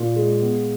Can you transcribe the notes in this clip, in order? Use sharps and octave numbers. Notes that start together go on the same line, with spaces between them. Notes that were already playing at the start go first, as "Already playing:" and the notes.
Already playing: A#2
G#3
B3